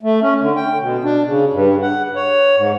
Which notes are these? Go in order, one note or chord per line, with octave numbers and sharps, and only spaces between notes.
A3
C#4
D3
G5
B2
D4
C#3
G2
F#5
C#5
G#2